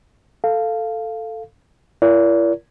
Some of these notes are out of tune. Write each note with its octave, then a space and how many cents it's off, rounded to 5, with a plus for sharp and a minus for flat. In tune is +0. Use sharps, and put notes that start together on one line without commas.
A4 +5 F5 -5
E4 +40 A#4 +20 D5 -40